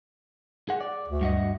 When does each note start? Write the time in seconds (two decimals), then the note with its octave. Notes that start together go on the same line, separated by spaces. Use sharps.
0.69 G#4 F#5
0.80 D5
1.08 D2
1.21 G2 F#4 D#5